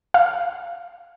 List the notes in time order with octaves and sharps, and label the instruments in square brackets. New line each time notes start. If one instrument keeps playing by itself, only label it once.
[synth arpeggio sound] F5